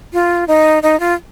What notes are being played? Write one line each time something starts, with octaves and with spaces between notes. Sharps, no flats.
F4
D#4
D#4
F4